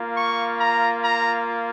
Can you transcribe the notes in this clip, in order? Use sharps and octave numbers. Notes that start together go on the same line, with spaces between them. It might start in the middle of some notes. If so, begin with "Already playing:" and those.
Already playing: A#3 F4
C#6
A#5
A#5